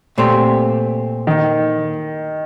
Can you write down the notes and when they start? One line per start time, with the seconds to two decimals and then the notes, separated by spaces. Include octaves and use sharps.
0.18 A#2 A3 C4 G4 C5
1.27 D#3